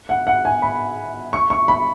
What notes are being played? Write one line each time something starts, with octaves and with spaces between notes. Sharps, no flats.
F#5
F#5
G#5
B5
C#6
C#6
B5